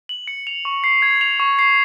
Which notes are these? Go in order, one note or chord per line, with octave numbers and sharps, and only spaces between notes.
F#7
C#7
F7
C#6
C7
G#6
F7
C#6
C7